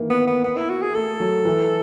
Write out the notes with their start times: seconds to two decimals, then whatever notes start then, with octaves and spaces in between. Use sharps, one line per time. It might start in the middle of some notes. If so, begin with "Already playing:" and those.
Already playing: D#3 E3 A#3
0.10 B3
0.27 B3
0.44 B3
0.57 E4
0.70 F#4
0.82 G#4
0.94 A3 A4
1.20 F#3
1.45 E3